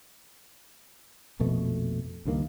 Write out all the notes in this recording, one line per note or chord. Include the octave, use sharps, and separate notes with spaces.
A#1 F2 B2 A3
C#2 G2 D#3 A#3